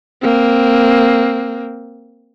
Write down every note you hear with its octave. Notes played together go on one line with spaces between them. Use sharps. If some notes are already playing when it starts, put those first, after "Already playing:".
A#3 C4